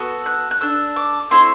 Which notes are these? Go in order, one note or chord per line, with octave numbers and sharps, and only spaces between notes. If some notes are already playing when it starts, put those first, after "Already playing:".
Already playing: B3 F#4 A4
F#6
F#6
D4 A4 E6
D6
A3 C4 E4 C6